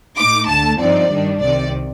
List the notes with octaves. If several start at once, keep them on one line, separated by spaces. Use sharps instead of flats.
A2 A3 D#4 D6
D2 D3 A3 A5
G2 F3 C4 D#4 D5
G2 D#3 G3 D4
C2 C3 D#3 D5